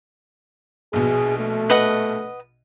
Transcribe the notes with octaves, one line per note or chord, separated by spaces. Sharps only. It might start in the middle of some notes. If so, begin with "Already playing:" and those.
A#1 B2 G#4
A3
B4 D#5 F#5